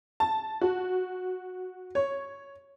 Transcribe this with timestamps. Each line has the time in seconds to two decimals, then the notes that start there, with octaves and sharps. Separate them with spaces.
0.20 A5
0.61 F#4
1.95 C#5